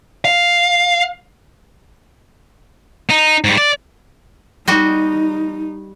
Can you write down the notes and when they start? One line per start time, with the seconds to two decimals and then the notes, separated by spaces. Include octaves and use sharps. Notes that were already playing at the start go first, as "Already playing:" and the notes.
0.25 F5
3.10 D#4
3.44 G#2 G3
3.58 D5
4.68 G3 D#4 F#4 D#5